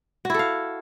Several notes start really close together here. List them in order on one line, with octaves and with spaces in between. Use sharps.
F#4 E4 A4 F5